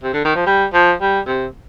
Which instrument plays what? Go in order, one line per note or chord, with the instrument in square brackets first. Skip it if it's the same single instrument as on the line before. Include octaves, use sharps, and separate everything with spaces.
[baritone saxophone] C3
D3
D#3
F3
G3
F3
G3
C3